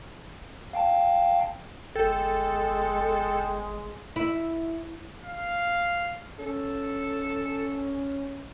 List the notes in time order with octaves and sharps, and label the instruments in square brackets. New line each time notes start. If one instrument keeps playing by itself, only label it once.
[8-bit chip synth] F5 G5 A5
[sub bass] G1 [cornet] G#3 [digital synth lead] A4 [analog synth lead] G5
[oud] E4
[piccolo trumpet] F5
[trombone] C#4 [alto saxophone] A4